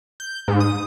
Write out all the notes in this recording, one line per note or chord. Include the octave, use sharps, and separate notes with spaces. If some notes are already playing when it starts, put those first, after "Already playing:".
G6
G#2
D#6